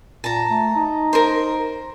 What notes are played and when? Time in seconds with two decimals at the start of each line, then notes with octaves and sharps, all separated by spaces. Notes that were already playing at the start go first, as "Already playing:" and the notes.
0.24 A#2 A5 A#5
0.50 A3
0.75 D#4
1.13 A#4 C5